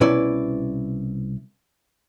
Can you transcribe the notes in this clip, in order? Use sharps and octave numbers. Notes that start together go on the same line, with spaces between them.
C2 B2 C#4 E4 B4 D5